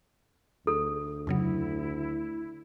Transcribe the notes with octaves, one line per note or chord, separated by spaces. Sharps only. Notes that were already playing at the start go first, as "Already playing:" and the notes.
D2 A4
F2 C#3 F#3 E4